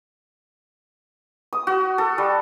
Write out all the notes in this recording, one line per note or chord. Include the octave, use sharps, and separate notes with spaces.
D#6
F#4
A4
G3